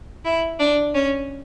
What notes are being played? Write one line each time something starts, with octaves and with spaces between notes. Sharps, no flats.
E4
D4
C#4